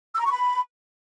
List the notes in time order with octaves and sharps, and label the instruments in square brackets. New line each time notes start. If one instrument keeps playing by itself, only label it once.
[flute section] E6
A#5
C#6
B5